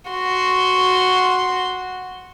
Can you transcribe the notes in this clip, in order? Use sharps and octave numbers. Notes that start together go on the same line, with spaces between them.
F#4 C6